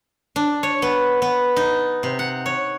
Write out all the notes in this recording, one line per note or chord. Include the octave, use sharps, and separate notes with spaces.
D4
C#5
B3
B3
D#4
C3
F#5
C#5